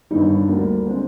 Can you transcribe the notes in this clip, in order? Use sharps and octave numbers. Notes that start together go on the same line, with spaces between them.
G1 G2 D#3 G3 D#4
D4
D2 D3 G3 A#3
D3 G#3 C4